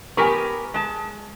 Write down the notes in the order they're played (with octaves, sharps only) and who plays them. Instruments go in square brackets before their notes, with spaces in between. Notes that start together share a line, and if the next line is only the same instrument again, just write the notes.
[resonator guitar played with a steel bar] B3 G4 A#4 [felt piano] G#5 C#6
[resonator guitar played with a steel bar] G#3 A5